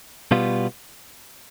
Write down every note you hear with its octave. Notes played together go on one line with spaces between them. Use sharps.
B2 G3 B3 F4